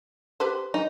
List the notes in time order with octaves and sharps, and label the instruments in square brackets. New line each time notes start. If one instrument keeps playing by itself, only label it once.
[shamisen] G4 B4 C5
[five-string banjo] D#4